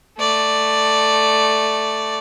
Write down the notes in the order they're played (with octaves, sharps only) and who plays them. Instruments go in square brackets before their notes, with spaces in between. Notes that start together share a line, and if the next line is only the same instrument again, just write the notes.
[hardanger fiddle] A3 D5